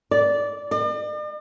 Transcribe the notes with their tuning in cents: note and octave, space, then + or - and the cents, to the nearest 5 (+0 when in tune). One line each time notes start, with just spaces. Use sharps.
D5 -15
D5 +45